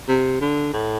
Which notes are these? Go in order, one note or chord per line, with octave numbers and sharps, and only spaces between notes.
C3
D3
A2